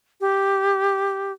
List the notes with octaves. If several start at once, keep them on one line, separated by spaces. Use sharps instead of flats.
G4